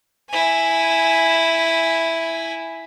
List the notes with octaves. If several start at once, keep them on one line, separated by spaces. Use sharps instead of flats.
E4 G#5